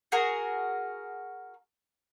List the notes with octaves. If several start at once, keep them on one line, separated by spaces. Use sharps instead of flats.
F#4 G#4 A#4